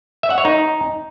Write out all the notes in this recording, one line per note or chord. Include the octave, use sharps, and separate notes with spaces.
E5
F#5
C#5
D#4